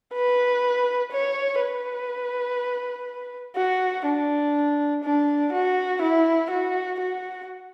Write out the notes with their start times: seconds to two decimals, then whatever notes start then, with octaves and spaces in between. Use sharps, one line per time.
0.13 B4
1.12 C#5
1.60 B4
3.56 F#4
4.05 D4
5.04 D4
5.53 F#4
6.02 E4
6.51 F#4
7.00 F#4